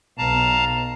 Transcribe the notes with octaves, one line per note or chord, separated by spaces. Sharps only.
B1 F5 A5 A#5